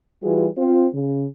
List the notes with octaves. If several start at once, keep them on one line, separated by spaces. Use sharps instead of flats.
E3 G3 F4 F#4 G#4 B4
C4 F4 C5
C#3